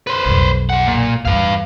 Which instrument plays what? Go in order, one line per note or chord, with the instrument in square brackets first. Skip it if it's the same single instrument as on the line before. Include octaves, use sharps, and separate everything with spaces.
[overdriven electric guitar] B4 C5
[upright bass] B1 F2
[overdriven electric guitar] G#4 F#5
A#2
[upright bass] E2 G2 [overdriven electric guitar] B4 F5